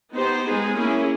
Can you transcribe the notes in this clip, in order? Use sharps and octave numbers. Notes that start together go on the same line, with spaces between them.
B3 D#4 G4 C5
G#3 B3 D#4 G#4
A#3 C#4 E4 G#4